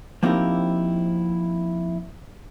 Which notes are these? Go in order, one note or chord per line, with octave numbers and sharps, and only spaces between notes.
F3 A#3 C4 D#4 E4 G4